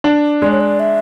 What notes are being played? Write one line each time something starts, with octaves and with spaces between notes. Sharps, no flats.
D4
G#3 D5
C#5
D5
E5